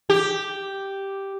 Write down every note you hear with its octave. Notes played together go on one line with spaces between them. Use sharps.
G4